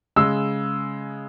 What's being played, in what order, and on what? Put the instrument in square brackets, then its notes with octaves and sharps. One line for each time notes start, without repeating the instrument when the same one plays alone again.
[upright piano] C#3 G#3 E6